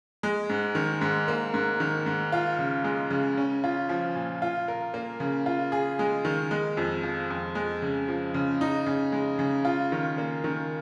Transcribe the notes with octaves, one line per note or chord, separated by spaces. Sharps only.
G#3
G#2
D#3
G#2
A#3
G#2
D#3
G#2
F4
C#3
G#3
C#3
C#4
F4
F3
A#2
F4
A#4
A#3
C#3
F4
G#4
G#3
D#3
G#3
F2
F3
F2
G#3
C#3
F3
C#3
D#4
C#3
G#3
C#3
F4
D#3
A#3
D#3